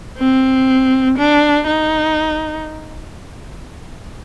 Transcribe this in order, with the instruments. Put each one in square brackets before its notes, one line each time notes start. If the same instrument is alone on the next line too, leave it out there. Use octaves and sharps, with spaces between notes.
[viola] C4
D4
D#4